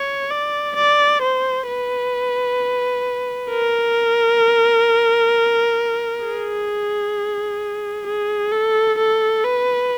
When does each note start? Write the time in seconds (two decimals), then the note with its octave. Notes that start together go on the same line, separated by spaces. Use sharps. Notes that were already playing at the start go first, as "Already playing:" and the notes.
Already playing: C#5
0.30 D5
0.76 D5
1.22 C5
1.68 B4
3.51 A#4
6.25 G#4
8.07 G#4
8.52 A4
8.98 A4
9.45 B4